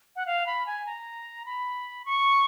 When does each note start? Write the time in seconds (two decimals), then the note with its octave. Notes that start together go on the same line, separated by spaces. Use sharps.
0.16 F#5
0.26 F5
0.46 B5
0.66 G#5
0.86 A#5
1.46 B5
2.05 C#6